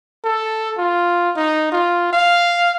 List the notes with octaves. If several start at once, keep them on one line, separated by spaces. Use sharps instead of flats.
A4
F4
D#4
F4
F5